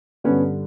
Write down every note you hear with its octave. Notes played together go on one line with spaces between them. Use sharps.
G2 D3 B3 C#4